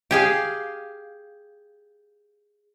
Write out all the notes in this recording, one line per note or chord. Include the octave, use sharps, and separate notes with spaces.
G4 G#4 F5